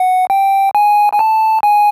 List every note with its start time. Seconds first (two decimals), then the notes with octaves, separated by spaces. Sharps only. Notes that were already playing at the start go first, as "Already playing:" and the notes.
Already playing: F#5
0.30 G5
0.75 G#5
1.13 G#5
1.19 A5
1.63 G#5